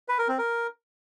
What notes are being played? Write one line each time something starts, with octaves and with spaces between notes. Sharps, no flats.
B4
A#4
C4
A#4